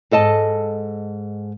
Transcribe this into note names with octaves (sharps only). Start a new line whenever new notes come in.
G#2 A4 D#5 A5